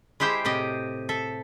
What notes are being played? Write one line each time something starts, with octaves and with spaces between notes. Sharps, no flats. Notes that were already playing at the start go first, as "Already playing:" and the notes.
G#3 E4 G4 C5 G5
A2 C3 G4 D#5
A4 E5